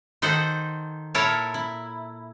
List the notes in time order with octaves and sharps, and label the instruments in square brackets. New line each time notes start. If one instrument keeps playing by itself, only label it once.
[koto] D#3 D#4 A4 C5 F#5
A#2 E4 A4 A#4 C#5 A5
E4